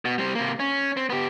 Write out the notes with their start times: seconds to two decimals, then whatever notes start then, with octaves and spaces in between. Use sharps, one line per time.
0.05 B2
0.18 G3 C4
0.35 C3 A#3
0.60 C#4
0.97 C4
1.10 B3 G4